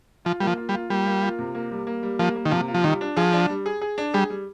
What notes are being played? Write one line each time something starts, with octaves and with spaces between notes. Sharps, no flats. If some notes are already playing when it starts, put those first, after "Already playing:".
F3 F4
G3 A#3
F3
F4
G3
F4
G3 A#3
A#3
F4
C3
A#3
G3
A#3
G3
F3 A#3
A#3
D#3
C3 F3
F4
F3
D#3 G3
D4
F3 G#4
D4
G3
G#4
G#4
D4
G3 G#4
G3